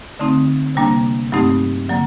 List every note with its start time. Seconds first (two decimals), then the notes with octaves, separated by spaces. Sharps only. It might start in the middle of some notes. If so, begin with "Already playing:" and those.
0.19 D3 A3 C4 D#4
0.75 C3 G3 A#3 D4
1.32 G2 F#3 A3 C4 D#4
1.89 D3 F#3 A#3